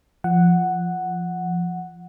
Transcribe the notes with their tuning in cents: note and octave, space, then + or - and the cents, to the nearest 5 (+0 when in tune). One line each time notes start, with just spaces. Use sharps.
F3 -10 F#5 +0